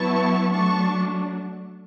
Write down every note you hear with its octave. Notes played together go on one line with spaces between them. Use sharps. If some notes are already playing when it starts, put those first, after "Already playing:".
Already playing: F#3 B3 E4 A5 C#6
F#3 A3 D4 A5 C#6